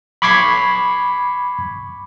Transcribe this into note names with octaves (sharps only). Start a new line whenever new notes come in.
B5 C#6 D6 G#6 B6 C7